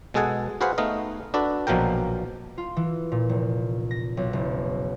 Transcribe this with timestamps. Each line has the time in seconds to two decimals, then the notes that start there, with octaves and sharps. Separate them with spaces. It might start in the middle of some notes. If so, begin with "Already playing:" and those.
0.14 B2 G#3 G#4 A4 F#5 G#5
0.61 F#4 G#4 B4 C5 F5 F#5
0.78 A3 B3 D#4 D#5 F5
1.34 D4 F#4 A4 B4
1.67 A#1 B2 F3 F#3 A#4 G5
2.58 F4
2.76 E3
3.12 A#2
3.29 F1
3.91 A#6
4.17 B1
4.33 F#1